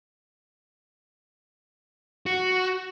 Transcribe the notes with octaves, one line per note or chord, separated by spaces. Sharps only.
F#4